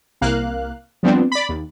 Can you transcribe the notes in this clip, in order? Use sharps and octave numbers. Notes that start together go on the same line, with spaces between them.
C2 A#3 F5 F#6
F3 G3 B3 C4 D4
D5 B5
D#2